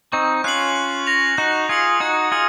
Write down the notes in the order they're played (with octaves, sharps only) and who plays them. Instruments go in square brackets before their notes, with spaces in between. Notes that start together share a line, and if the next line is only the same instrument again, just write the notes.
[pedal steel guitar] C4 D#4 [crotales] C#6
[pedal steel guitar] C#4 F4 [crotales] F#6 C7 F#7
[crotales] F#6
A#6 F7
[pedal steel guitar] D#4 F#4 [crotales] F#6
[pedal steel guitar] F4 G#4 [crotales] A#6 C#7 F#7
[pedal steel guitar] D#4 F#4 [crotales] G#6
[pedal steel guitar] F4 G#4 [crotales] C#7 F#7